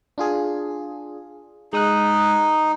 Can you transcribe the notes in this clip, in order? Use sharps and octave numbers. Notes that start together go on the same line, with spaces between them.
D4 F4 G#4
G#3 D#4 D#6 F#6